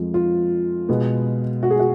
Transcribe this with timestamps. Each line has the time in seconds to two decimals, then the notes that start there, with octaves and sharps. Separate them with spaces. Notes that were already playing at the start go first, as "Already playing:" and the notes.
Already playing: F2 F3 G#3
0.14 F4
0.89 B2 G#3 B3
1.63 F#4
1.70 G#4
1.79 F#4